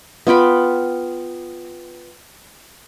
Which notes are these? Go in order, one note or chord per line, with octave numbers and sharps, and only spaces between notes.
B3 F4 G5 B5